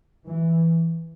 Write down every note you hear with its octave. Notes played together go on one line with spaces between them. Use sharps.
E3